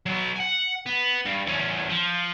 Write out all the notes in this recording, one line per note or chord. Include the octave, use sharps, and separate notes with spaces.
F#3 B3
F#5 G#5
B3
G2
E2 C#4
F3